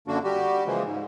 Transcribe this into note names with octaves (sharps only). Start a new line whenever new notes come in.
F#2 D3 A#3 D4 F#4
G3 F#4 G4
C#3 E3 F3 G#3 A#3
G#2